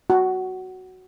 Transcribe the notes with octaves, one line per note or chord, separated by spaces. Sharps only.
F#4